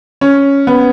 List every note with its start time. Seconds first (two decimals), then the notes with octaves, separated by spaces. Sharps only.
0.21 C#4
0.67 B3